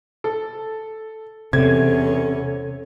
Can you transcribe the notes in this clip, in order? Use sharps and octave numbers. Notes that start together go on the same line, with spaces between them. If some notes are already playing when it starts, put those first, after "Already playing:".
A4
E2 C3 C#4 A4 G#6